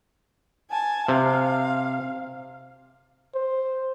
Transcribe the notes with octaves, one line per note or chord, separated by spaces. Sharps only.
G#5 A5
C3 F5
C5